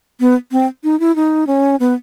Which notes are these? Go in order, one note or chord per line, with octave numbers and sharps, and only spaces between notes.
B3
C4
D#4
E4
D#4
C#4
B3